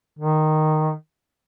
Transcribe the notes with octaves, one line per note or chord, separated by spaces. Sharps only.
D#3